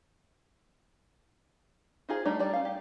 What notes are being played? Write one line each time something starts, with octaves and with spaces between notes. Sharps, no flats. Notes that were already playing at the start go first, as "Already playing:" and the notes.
D#4 F4 G#4 A#4 C5
G3 A3 D4 D#4 A#5
G3 D5
C#4 F5
G4